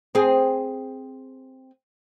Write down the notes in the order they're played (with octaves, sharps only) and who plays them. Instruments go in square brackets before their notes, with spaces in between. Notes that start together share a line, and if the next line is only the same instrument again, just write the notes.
[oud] C4 G#4